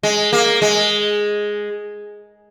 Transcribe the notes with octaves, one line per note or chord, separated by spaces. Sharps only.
G#3
A#3
G#3